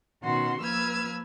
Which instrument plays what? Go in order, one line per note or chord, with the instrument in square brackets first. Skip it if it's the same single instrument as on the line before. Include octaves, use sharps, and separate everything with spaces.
[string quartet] B2 D#3 C#4 F#4 C6
F3 A#3 B4 E6 F6 G#6